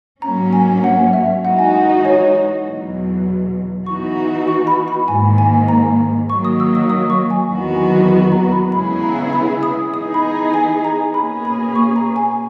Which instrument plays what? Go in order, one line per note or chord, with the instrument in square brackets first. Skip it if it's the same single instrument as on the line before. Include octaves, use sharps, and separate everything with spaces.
[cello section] G#2 F#3 A#3 C#4 [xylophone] A#5
[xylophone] G#5
F#5
E5
[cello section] E3 G#3 D#4 F#4 [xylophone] F#5
[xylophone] G#5
F#5
D#5
C#5
D#5
[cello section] E2 B2 F#3
[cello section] E3 B3 D#4 F#4 [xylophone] C#6
[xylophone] C#6
B5
B5
[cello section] G#2 D#3 A#3 [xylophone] G#5
[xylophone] G#5
A#5
[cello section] D#3 F#3 A#3 [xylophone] C#6
[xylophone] D#6
E6
D#6
D#6
C#6
G#5
[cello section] E2 D#3 F#3 B3 F#4
[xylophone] A#5
B5
[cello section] C#3 G#3 B3 E4 G#4 [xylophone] B5
[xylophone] A#5
B5
D#6
[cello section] E3 B3 D#4 G#4 [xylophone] D#6
[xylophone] B5
A#5
G#5
A#5
[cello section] B2 A#3 C#4 G#4 [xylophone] B5
[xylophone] B5
C#6
A#5
G#5